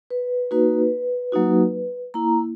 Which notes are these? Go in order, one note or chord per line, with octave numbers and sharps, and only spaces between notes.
B4
A#3 D#4 F#4 B4
F#3 A#3 D#4 F#4
A#3 E4 A#5